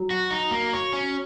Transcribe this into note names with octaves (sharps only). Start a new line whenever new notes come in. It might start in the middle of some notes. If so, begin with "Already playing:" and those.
Already playing: F#3
F#4
D#4
A#3
C#5
C#4